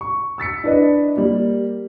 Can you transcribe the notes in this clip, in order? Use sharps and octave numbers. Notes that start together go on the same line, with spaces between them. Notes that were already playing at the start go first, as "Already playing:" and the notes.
C#6
E6 A6 B6 C#7
D4 E4 B4 D#5
G3 A#3